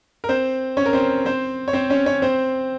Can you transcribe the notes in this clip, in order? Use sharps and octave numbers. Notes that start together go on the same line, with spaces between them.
A#4
C4 C5
C#4 C#5
A#4
C4 C5
C4 C5
C#5
C4 C5
C#4 C#5
C#4 C#5
C4 C5